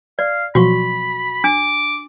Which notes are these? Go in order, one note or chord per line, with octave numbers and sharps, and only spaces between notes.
D5 F5
B2 F3 F#3 F#4 B5 C#6
D4 D6